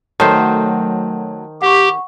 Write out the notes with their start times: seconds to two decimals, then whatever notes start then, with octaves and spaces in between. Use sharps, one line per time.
0.20 D#3 F#3 A3 C5 A5
1.62 G4 F#5 C#6